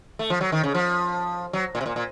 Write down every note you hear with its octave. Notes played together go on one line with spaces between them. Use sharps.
A3
F3
F#3
D#3
C#3
F3
F#3
A#2
C3
A#2
A#2